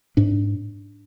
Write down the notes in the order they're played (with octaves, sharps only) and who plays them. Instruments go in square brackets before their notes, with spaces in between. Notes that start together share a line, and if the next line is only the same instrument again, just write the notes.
[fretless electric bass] G#2 D4